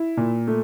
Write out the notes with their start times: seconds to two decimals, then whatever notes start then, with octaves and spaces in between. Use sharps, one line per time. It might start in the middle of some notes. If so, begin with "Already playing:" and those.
Already playing: E4
0.17 A#2
0.47 A3